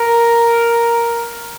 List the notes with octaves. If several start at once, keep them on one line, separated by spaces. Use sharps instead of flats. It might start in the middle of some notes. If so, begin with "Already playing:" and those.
Already playing: A#4